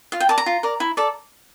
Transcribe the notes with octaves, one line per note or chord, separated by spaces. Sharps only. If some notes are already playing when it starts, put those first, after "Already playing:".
F4 F5
G5
A#4 D5 A5
A#5
F4
A#4 D5
E4
A4 D5